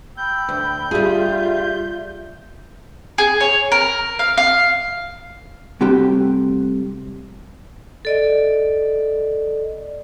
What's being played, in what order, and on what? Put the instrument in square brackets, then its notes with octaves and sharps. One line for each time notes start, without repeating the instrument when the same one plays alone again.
[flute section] G5 B5 E6 [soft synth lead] G6
[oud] D2
[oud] G3 G#4 [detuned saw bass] F4 [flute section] E5
[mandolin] G#4
C#5
A#4
F5
F5
[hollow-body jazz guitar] C3 G3 A3 F#4 G4 G5
[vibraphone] A4 D5 D#5